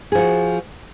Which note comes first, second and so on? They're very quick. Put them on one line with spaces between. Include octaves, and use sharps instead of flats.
G#4 F3 F#4